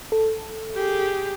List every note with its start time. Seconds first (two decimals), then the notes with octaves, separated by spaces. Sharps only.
0.12 A4
0.74 G4 G#4